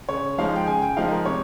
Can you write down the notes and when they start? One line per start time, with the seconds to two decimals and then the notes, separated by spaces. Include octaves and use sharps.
0.09 C#3 C#5
0.38 F3 G#3 D#4 F5
0.56 G5
0.67 C#3 G#5
0.82 G5
0.97 F3 G#3 D#4 F5
1.11 A#4
1.25 C3 C#5